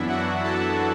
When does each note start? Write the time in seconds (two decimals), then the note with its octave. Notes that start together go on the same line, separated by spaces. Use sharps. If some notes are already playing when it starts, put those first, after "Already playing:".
Already playing: F#2 E3 B3 D4 E4 E5
0.09 F#4 F#5
0.44 A4 A5